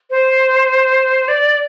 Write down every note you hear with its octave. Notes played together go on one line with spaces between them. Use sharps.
C5
D5